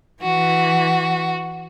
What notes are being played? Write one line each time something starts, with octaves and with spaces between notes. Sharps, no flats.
E3 F#4